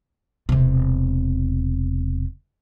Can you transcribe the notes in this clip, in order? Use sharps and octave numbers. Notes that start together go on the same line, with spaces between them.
E1 C3